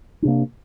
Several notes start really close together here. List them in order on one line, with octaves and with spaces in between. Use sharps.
D4 C3 A#3